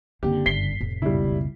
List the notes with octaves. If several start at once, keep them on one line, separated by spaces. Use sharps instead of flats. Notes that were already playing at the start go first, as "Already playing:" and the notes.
F#1 B2 D3 A#3 C4 G4
G1 B6 C7 G7
F1 A2
F#1 C#2 B2 G3 E4